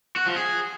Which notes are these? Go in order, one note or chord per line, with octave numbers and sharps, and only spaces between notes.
F#4
F3
G#4